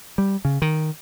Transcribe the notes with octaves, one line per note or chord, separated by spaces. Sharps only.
G3
C#3
D#3